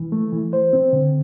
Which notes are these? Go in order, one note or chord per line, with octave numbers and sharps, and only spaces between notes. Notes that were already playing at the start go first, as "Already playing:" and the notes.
Already playing: E3
A3
E3
C5
C4
D3